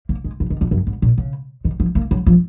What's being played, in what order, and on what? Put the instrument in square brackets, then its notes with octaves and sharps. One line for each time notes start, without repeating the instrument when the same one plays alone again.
[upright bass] A#3
G#3
F3
D#3
F2
F#2
G#2
A#2
C#3
D#3
F3
A#3
F#3
F3